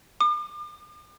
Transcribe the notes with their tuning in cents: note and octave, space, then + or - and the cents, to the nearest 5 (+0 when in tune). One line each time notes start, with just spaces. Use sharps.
D6 +40